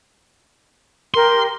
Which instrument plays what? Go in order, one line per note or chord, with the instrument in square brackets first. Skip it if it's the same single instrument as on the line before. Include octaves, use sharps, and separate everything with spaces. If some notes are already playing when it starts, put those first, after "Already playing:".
[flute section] G4 A#4 [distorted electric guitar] C6